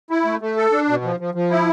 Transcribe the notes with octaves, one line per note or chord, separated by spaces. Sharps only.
E4
A3
A3
A4
D4
B2
F3
F3
F3
E4